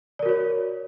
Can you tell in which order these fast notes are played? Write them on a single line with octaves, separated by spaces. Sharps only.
D5 A#4 F#4 C#5